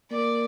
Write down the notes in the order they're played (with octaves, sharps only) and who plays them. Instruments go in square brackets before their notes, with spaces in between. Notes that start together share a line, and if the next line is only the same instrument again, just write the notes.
[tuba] A#3 [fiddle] D5